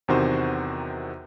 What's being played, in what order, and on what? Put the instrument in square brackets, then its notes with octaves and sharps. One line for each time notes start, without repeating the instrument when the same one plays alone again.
[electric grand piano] E2 C3 D#3 F#4 A#4 C5